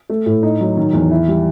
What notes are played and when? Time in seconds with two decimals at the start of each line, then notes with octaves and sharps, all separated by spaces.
0.10 A3
0.26 A2
0.43 D#4
0.61 F#3
0.77 D#3
0.93 E2
1.11 E4
1.28 G3